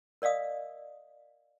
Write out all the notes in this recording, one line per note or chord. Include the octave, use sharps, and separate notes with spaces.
A#4 D5 D#5 F5 D#6